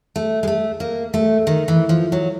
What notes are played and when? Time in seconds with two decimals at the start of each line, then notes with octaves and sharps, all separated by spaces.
0.16 A3
0.43 G#3
0.48 A3
0.80 A#3
1.14 A3
1.47 D#3
1.68 E3
1.89 F3
2.12 F#3